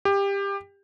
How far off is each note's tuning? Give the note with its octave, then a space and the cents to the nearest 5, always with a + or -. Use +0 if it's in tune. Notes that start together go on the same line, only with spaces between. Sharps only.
G4 +20